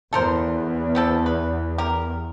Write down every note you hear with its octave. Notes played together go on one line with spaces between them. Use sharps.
E2 A4 A#4 C5
B3 C4 A4
B4
G4 A#4